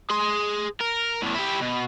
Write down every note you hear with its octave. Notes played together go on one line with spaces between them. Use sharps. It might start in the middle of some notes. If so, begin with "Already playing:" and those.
G#4 C6
A#4
E2 A2
E4 G4
B2